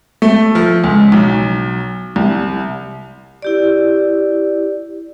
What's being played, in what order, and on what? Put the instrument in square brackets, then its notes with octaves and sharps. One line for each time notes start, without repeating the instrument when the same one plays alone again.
[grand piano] A3
F3
C#2
B1
C2
[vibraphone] E4 G4 D5